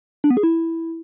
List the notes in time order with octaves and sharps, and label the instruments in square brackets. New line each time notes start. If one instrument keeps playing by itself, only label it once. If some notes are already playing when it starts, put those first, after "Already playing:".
[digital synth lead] D4
B3
G#4
E4